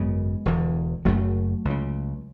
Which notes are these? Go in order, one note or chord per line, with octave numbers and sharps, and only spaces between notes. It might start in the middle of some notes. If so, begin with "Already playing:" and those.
Already playing: G#1 F#2 C#3 G#3 B3
E1 E2 D3
F#1 F#2 C#3 F#3 A3
C#2
C#3